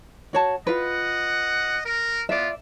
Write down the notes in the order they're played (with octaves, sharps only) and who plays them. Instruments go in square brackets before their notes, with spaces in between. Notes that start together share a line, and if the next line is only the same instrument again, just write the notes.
[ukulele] F#4 C#5 A5
[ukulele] F4 B4 [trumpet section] D#5 F#5
[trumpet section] A#4
[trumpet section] B3 F4 [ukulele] D5 E5